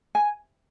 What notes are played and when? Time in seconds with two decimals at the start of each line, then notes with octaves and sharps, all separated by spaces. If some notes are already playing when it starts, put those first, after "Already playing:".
0.15 G#5